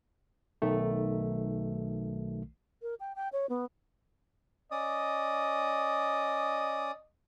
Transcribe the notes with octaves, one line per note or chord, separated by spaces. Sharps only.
B1 D#3 A3
A#4
G5
G5
C#5
B3
C#4 D5 D#5 D#6